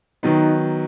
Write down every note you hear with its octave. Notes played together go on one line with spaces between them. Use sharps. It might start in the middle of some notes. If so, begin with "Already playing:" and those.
D#3 F#3 B3 D#4